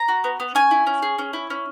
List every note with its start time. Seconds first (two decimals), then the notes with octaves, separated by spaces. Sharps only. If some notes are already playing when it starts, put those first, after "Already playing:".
Already playing: A#5
0.08 F#4
0.24 B3
0.40 B3
0.55 C#4 G#5
0.71 E4
0.87 C#4
1.02 G#4
1.19 C#4
1.33 E4
1.50 C#4